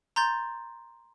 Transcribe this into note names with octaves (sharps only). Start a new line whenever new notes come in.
A#5 C6 G6 A6